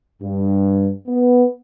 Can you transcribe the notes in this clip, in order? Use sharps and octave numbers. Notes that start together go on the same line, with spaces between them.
G2
B3